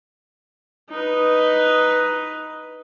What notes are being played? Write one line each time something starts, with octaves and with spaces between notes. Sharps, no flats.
D#4 B4